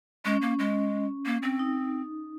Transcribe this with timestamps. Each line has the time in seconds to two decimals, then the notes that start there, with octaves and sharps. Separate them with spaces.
0.25 G#3 C#4
0.42 A#3
0.59 G#3
1.26 A#3
1.42 C4
1.59 D#4